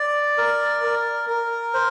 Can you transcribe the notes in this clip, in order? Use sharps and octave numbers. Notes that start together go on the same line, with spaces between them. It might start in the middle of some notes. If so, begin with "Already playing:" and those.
Already playing: D5
A#4
A#4
A#4
C5